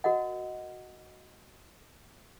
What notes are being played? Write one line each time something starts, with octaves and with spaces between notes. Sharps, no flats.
F#4 A#4 D#5 F#5